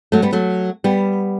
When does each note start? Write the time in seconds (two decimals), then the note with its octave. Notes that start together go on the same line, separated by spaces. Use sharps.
0.12 F#3 A3
0.22 G3 B3
0.33 F#3 A3
0.84 G3 B3